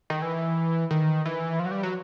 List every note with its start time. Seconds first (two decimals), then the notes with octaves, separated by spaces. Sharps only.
0.10 D#3
0.22 E3
0.91 D#3
1.25 E3
1.60 F3
1.65 F#3
1.71 G3
1.83 F#3